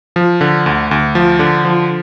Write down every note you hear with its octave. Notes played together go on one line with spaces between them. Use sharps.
F3
D3
D2
D2
F3
D3
F3